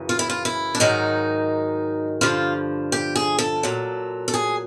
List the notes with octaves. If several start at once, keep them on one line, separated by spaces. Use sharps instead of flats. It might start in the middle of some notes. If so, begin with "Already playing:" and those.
Already playing: F#2 C#3 E3
F4
E4
F4
E4
D4
G#2 D#3 F#3 D#4
G2 D3 F3 F4
G4
G#4
A4
A#2 F#3
A4
G#4